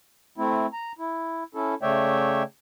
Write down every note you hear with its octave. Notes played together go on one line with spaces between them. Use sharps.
A3 C4 E4
A#5
E4
C#4 E4 A4
C#3 A3 C#5 D5 E5 G5